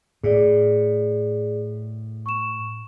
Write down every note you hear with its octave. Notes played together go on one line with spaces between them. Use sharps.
A2 G#4 D5
C#6 E7